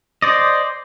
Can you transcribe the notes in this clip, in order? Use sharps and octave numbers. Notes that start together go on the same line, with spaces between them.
C5 D5 D#5